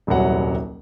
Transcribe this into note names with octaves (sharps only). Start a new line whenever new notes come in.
D#1 C2 C3 F#3 F#5